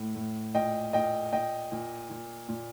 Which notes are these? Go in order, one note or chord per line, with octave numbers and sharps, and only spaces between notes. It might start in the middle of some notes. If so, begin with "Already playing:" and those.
Already playing: A2
A2
A#2 D#5 G5
A#2 D#5 G5
A#2 D#5 G5
A#2
A#2
A#2